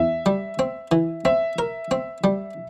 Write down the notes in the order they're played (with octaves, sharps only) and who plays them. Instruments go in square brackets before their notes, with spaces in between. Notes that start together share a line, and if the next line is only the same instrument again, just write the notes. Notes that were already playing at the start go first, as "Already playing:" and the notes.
Already playing: [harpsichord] E2 [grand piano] E5
[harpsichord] G3
C4
E3
[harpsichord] C4 [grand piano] E5
[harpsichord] A#4
C4
G3